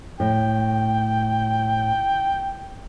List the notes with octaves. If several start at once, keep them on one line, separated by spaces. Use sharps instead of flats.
A2 G5